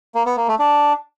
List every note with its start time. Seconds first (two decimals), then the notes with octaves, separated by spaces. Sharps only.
0.15 A#3
0.26 B3
0.37 A#3
0.48 A3
0.59 D4